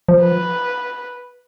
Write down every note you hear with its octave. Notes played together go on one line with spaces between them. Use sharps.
F3
B4